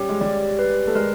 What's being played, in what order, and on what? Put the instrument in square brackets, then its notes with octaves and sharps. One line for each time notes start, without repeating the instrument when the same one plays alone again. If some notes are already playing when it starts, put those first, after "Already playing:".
Already playing: [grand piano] G3 C#4 [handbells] G4
[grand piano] G#3
[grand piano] G3 [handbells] D5
[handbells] B4
[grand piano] A3
[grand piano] G#3 [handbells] A#4